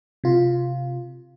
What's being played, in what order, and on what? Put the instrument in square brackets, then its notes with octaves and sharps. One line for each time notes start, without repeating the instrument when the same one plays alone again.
[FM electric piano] C3 F4